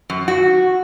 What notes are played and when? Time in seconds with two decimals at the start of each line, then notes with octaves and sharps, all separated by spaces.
0.10 F#2
0.28 F#4